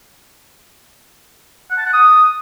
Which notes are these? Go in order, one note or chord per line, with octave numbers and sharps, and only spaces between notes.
F#5
A5
F#5
D#6